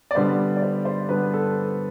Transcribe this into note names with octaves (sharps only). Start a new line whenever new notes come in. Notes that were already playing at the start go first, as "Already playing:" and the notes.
D5
D3 G3 B3 C5
D5
C5
C5
D3 G3 B3 B4
A4